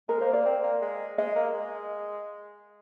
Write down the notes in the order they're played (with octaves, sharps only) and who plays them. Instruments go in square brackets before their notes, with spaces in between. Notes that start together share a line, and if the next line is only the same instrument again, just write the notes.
[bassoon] G#3 [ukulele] A#4
[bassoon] A#3 [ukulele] C5
[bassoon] A#3 [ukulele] D5
[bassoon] C4
A#3
G#3
[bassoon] G#3 [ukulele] D#5
[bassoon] A#3
G#3